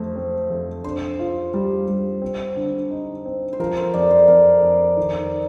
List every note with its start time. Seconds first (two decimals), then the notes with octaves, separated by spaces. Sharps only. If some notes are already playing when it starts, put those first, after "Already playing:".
Already playing: F2 A3 C5
0.16 C4
0.50 F2
0.84 D4 C5
1.19 F4
1.54 G3
1.88 G3
2.22 C4
2.56 D3
2.90 D#4
3.25 C4
3.53 C5
3.60 F3 A#4
3.77 C5
3.94 F2 D5
4.11 C5
4.28 F2 A#4
4.63 F2
4.97 D#3